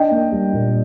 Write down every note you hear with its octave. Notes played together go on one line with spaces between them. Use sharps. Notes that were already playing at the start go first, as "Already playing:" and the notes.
Already playing: D4 D#5 G5
A#3
G3
A#2